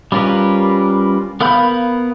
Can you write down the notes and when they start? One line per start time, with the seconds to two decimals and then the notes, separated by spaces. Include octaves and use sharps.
0.12 G3 C#4 F4 A#4 B4
1.41 B3 A#4 F5 B5 G6